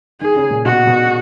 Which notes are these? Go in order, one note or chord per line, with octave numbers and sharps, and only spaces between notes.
D#3 G#4
C#3
A#2
B2 F#4
B2